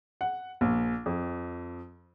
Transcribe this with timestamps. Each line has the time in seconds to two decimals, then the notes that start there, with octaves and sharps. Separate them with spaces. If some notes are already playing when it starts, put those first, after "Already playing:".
0.21 F#5
0.61 A#1
1.06 F2